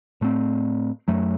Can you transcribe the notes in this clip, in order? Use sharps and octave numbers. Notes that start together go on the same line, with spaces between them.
A2 A3 C4
F#2 F#3 A3